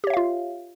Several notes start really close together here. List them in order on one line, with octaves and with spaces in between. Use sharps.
G4 C#5 E5 F5 F4